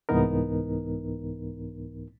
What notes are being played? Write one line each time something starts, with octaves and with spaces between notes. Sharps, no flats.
C2 G#2 E3 B3 D#4 A#4